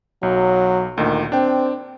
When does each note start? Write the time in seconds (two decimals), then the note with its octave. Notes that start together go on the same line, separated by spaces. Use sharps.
0.23 B1 F#3
0.97 D2 A#2 D#3
1.32 C4 D4 G5